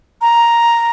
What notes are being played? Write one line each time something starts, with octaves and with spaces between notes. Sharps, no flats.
A#5